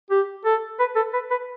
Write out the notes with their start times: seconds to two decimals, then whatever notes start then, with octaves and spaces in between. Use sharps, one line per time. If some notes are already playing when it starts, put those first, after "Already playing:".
0.11 G4
0.45 A4
0.79 B4
0.95 A4
1.13 B4
1.30 B4